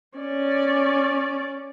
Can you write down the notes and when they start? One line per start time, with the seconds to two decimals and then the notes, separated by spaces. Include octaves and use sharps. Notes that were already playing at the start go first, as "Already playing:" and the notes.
0.18 C#4 D5